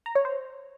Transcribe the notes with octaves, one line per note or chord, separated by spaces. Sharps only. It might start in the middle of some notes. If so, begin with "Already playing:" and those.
A#5
C#5
C5